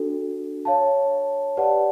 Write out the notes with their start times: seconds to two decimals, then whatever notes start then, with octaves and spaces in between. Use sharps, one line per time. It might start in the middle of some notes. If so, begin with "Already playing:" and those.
Already playing: D4 F#4 A4
0.65 C#5 F5 A5
1.57 G4 B4 D5 F#5 A5